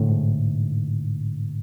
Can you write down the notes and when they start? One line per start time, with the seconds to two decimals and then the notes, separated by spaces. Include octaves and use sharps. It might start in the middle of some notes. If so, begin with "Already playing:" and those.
Already playing: A2 D3
0.09 G#2